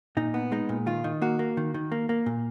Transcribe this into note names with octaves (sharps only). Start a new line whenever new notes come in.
A#2 D#4
B3
G#3 D#4
A#2
D#3 F4
D#3
A#3 F#4
A#3
D#3
D#3
A#3
A#3
A#2